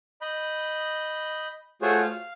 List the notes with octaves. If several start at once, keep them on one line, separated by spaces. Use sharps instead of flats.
D#5 B5 G6
A3 F4 F#4 G#4 C5 C#5
F5